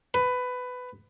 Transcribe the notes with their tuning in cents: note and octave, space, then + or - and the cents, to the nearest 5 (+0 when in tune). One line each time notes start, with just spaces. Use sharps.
B4 +15